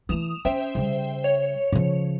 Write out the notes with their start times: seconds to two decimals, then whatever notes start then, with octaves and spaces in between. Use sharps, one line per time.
0.09 E3 A3 D#6 E7 F7
0.45 C#4 C5 E5 G5
0.75 C#3 G3
1.24 C#5
1.72 C#3 F3